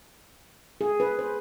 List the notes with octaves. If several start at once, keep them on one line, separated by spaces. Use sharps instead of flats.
G#4
B4
C5